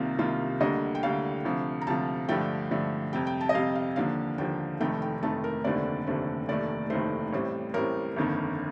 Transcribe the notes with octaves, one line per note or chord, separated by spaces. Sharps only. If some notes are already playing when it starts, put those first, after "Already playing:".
Already playing: C2 C3 D#3 A#3 F4
C2 C3 D#3 A#3 F4
D2 D3 G3 A#3 D#5
G5
D2 D3 G3 A#3 F5
D2 C3 F3
A#5
D2 C3 F3 A5
G2 D3 F3 A3 G5
G2 D3 F3 A3
F2 C3 G3 G5
G5
A5
D#5
F2 C3 G3 F5
F5
D#2 D3 F3 A#3 F5
D#2 D3 F3 A#3 G5
F1 F2 D#3 A3 G5
G5
F1 F2 D#3 A3 A5
A#4
F1 D#2 D3 A3 C4 D5
F1 D#2 D3 A3 C4
F1 D#2 D#3 A3 D5
F1 D#2 D#3 A3 C5
A1 A2 G3 C4
A1 A2 G3 C4 A#4
G1 F2 D#3 A#3